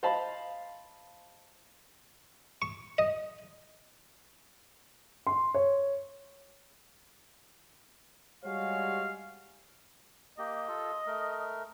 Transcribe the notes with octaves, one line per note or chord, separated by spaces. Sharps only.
C5 D#5 F5 A5 B5
C#6
D#5
C6
C#5
G3 G#3 F#4 C#5 F5
A#3 G4 D#5
F4 A4
A3 A#4